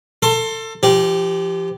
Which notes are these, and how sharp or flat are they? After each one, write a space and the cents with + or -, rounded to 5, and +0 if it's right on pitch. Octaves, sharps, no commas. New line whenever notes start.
A4 +25 C6 +20
F3 -35 G4 -5